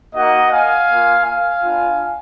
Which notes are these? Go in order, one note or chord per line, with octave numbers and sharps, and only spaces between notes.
A#3 D#4 F#4 D#5 F#5
F5 G#5
A#3 F4
F5 G#5
B3 D4 F4